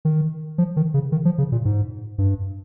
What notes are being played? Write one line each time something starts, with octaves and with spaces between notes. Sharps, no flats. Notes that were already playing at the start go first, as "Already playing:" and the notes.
D#3
F3
D#3
C#3
D#3
F3
C#3
A#2
G#2
G2